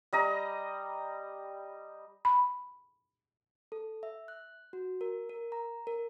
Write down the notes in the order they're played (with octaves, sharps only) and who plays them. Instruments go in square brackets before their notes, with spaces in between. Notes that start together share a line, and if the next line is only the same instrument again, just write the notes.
[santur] G3 D#5 A#5
[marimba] B5
[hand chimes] A4
E5
F#6
F#4
A#4
A#4
A#5
A#4